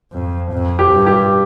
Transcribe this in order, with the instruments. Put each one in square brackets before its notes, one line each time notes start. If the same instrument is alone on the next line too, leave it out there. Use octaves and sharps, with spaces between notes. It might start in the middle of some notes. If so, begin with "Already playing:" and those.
[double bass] F2
F2
[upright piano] G4
[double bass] G2
[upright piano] G4